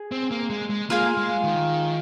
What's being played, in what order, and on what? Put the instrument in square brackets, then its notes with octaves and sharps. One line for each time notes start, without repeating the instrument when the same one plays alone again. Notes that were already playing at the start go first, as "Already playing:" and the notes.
Already playing: [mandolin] G#4
[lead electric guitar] C4
A#3
G#3
G#3
[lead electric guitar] A#3 [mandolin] F4 G#4 F5
[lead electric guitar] G#3
D#3